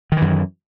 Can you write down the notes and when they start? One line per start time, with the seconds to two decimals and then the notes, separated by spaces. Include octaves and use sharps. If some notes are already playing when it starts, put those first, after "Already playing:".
0.12 D#3
0.17 E3
0.22 F#2